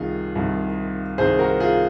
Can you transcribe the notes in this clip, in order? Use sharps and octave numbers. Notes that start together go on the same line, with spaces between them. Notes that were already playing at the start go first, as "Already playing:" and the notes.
Already playing: C2 C3 D#3 F4 G#4
C2 C3 D#3
C2 C3 D#3 G#4 C5
F#4 A#4
F4 G#4